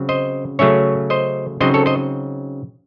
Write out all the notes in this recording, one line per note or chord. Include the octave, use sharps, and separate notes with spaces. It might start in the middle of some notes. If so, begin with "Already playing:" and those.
Already playing: C#3 F#3 C4
C5 D#5
C#3 F#3 A3 C#4 C#5 E5
C5 D#5
C#3 F#3 C4 D#4 C5 D#5
A4 C#5
C5 D#5